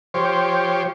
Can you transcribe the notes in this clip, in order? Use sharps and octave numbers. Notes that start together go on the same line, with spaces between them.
F3 G4 C5 C#5